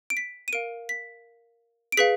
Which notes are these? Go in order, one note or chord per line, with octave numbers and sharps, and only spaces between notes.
D7
B6
D#7
A#4 F5 D7
B6
D7
G#4 B4 F5 B6